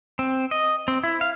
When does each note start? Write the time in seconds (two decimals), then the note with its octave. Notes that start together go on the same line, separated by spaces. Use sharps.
0.19 C4
0.51 D#5
0.88 C4
1.04 E4
1.21 F5